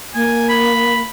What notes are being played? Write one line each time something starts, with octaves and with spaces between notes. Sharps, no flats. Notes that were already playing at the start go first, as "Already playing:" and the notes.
A#3 G#5
B5